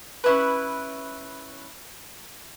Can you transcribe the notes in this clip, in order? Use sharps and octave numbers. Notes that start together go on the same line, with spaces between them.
C#4 E4 B4